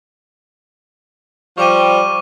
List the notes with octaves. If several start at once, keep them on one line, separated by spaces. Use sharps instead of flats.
F3 G3 C#6 D6 D#7